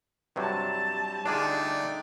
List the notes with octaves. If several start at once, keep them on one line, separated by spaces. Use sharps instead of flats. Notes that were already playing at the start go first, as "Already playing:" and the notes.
G2 C3 F#3 G3 A5
D3 A3 D4 D#4 F4 G#4 D5 G5